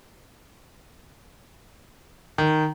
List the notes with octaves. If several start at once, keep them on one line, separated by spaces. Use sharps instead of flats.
D#3